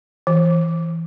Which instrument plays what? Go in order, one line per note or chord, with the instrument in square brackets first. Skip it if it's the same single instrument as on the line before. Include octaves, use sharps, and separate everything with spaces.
[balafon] E3